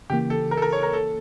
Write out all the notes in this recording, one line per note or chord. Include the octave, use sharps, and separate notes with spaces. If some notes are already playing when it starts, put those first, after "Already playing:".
C#3 E3 A#3 G4
A4
A#4
A4
A#4
C#5
A#4
A4